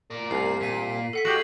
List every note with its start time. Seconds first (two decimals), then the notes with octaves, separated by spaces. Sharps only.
0.11 A#4 D5
0.31 C2 C7
0.61 A#2 B6 D#7
1.13 A4 F#5 B6
1.25 G#3 F#4 G4 C7 F#7